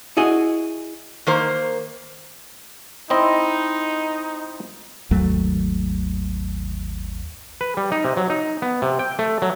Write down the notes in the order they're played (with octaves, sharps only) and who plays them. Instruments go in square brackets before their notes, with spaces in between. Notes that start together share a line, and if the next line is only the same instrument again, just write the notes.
[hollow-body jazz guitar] E4 F#4 G#4 D#5
[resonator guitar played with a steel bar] D#3 A#3 C5
[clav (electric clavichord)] C4 E4 D#5 [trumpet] D#4
[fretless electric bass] G#1 D#2 F#3 A3
[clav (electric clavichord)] B4
G3
D#4
C3
F#3
D#4
B3
C3
G5
A3
F#3